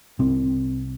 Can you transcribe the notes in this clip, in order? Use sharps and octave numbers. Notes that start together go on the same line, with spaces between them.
C2 C3 C4